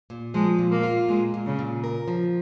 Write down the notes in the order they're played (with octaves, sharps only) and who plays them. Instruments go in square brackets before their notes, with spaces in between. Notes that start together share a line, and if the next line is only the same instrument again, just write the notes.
[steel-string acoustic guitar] A#2
[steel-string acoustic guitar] F3 [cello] G#3
[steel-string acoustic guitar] A#2
[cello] A#3
[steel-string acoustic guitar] F4
[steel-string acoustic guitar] A#2 [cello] G#3
[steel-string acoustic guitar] A#2
[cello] C#3
[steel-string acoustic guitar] A#2
A#4
F3